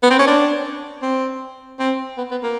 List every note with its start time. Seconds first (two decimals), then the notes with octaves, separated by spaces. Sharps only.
0.03 B3
0.10 C4
0.19 C#4
0.27 D4
1.02 C4
1.79 C4
2.17 B3
2.31 B3
2.43 A#3